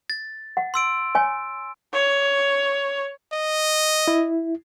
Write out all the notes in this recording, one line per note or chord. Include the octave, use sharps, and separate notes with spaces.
A6
F#5
C6 E6 D7
C#5 G#5
C#5
D#5
E4